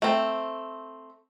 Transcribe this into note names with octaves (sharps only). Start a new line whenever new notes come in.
A3 C4